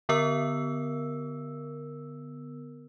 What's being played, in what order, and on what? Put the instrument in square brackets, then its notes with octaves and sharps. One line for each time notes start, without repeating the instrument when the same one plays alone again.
[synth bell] D3 B3 A#4 E6